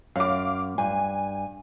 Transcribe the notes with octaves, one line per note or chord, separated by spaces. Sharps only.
F#2 F5 D6
G2 G#5